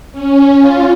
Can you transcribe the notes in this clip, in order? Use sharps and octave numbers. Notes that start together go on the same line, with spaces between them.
C#4
F4